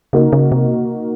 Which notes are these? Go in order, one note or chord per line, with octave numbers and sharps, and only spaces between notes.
C#3 A#3 D#4 F#4 A#4
C#3
C3